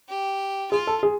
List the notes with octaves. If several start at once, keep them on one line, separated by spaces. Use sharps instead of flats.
G4
F4 G#4
A4
G#4